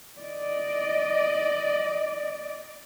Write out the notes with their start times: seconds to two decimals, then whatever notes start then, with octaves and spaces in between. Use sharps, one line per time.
0.21 D5 D#5